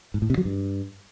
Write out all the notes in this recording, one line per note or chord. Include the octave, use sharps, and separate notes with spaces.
G#2
A2
C3
F#3
G2